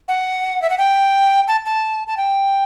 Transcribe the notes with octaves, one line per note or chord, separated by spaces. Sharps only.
F#5
E5
F#5
G5
A5
A5
A5
G5